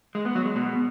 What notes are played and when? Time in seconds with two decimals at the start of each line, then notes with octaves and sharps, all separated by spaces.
0.15 G#3
0.25 B3
0.35 F#3
0.45 G#3
0.56 B2